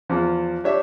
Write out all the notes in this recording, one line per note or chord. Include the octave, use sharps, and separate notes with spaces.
E2 F3
D4 G4 C#5 E5